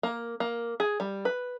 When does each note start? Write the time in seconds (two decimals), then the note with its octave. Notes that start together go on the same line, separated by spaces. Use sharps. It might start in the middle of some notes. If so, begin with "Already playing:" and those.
0.03 A#3
0.40 A#3
0.80 G#4
1.00 G3
1.25 B4